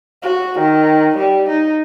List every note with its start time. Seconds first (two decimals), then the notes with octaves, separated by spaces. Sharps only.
0.22 F#4
0.59 D#3
1.17 G3
1.49 D#4